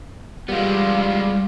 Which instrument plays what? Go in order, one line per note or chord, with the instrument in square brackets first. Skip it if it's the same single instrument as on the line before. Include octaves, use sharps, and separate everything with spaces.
[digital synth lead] G3 [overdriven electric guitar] G#3 B3 [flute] F4